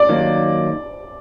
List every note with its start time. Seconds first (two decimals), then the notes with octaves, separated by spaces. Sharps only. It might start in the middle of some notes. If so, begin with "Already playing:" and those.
Already playing: D5
0.09 D#3 F#3 A#3